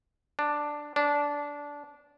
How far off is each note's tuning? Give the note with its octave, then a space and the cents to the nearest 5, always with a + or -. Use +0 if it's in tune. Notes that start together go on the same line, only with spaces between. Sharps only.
D4 +5
D4 -15